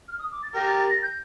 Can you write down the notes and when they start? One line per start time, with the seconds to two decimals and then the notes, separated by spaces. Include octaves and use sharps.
0.08 F6
0.19 D#6
0.32 D6
0.43 A6
0.54 G4 A#4 A#6
0.67 A6
0.79 A6
0.90 A#6
1.02 G6